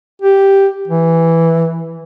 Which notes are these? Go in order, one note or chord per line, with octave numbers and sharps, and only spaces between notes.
G4
E3